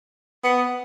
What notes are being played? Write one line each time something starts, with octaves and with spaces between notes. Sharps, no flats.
B3